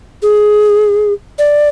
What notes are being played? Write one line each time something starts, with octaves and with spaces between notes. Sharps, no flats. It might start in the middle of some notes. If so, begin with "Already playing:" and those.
G#4
D5